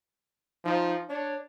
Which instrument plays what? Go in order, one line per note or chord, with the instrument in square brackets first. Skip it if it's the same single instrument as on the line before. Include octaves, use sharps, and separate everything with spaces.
[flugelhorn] F3 [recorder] D#4
[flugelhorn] D4 [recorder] C#5